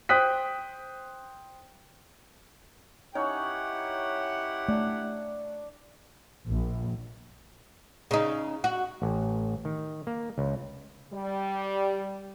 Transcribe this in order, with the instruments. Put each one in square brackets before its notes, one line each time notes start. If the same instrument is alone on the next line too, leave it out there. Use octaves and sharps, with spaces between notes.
[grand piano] C5 G5 D#6 F#6 B6
[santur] C#4 D#4 C#5 [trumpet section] E4 G4 F#5
[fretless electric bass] A3 [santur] D4
[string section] A#1
[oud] C#3 D#4
F#4
[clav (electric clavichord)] A1
D#3
A#3
C#2
[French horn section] G3